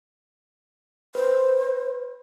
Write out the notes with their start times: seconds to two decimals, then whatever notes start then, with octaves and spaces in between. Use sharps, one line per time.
1.15 B4 C5